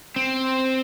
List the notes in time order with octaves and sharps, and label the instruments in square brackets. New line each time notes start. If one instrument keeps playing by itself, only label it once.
[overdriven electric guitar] C4